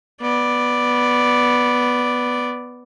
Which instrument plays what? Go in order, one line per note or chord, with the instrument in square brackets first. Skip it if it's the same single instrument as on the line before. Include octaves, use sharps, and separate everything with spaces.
[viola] B3 D5